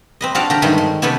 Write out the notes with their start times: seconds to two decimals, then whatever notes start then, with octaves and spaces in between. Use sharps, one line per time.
0.21 C4 B4 D#5
0.35 C4 D4 F#4 D5 F5
0.50 D3 G4 A#4
0.62 G2 D#3 G#3 A3 B4
0.78 G#3
1.02 C3 B3 C#4 G4 A4 B4